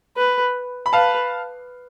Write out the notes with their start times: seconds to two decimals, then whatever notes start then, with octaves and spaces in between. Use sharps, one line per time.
0.17 B4
0.86 B5
0.93 B4 F5 A5